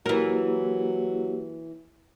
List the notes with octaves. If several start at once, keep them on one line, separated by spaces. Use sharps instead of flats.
E3 F#3 A#3 E4 G4 A#4